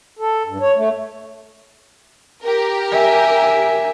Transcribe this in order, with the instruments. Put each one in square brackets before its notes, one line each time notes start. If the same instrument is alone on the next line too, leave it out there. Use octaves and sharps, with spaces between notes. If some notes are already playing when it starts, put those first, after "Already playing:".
[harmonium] A4
G2
C#5
A3
[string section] G4 A#4
[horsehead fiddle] E5 G#5